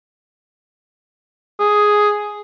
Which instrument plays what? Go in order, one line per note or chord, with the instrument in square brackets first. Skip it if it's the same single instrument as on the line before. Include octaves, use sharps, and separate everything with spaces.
[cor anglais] G#4